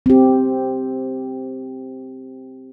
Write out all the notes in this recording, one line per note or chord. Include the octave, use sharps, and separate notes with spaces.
C4 G4